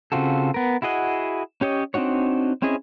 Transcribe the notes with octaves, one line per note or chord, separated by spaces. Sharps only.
C#3 C4 F4 F#4 A4
B3 A#4
E4 F#4 G#4 D#5 F#5
C#4 G4 C#5 D#5
C4 D4 D#4 F#4 C#5
C4 C#4 E4 G#4 D#5